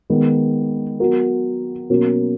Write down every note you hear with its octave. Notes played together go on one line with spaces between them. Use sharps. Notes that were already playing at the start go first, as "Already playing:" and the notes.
D#3 G#3 B3
F#3 B3 F#4 A#4
B2 F#3 A#3 C#4